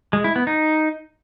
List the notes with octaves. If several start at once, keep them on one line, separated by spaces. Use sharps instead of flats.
G#3
E4
B3
D#4